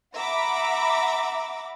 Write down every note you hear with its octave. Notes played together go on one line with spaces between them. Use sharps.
E5 F#5 A#5 B5 D6